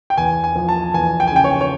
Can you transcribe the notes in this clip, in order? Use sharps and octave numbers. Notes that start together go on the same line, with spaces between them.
G5
E2 G#5
G#5
F3
A5
E2 G#5
G5
G#5
C#3 G5
C#5
C#5